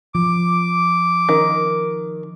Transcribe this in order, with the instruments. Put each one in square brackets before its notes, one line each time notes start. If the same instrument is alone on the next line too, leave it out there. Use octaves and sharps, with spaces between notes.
[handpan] F3 [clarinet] D6
[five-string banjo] D#3